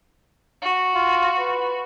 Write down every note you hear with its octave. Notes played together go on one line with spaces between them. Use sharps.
F#4
F4
B4